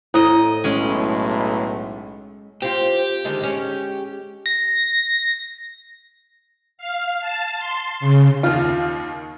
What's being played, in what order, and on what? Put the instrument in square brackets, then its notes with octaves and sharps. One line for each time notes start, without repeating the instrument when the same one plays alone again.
[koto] A2 D#5 [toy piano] E4 C5 D#6
[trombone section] B1 A2 [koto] G#3 C#4
[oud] C4 F4 [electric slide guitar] G4
[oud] D3 D#3 G#3
G#3 C#4
[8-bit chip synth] A#6
[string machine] F5
A5
C6
C#3
[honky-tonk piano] D#2 D#3 F5 [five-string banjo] F4